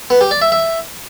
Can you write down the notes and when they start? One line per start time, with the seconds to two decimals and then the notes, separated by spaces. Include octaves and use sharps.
0.10 B3
0.21 G4
0.31 D5
0.42 E5
0.52 E5